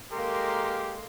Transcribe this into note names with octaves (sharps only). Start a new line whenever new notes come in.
G#3 A#3 G4 A4 A#4 C6